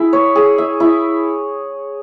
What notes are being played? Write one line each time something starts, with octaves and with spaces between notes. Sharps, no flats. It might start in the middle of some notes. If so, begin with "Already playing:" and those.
Already playing: E4 G#4
C#5
G#4
E5
E4